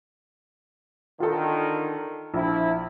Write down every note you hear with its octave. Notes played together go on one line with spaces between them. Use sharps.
D3 D#3 F4 A4
A#1 F3 E4